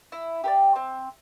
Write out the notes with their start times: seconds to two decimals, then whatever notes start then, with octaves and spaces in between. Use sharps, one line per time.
0.12 E4
0.44 G4 A#4 D5
0.76 C4